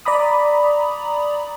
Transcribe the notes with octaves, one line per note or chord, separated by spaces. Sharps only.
D5 A#5 B5 D#6